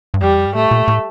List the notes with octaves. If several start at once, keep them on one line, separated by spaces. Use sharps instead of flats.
G2
F2 G3
E2
F2
G2
A2 A3
A#2
A2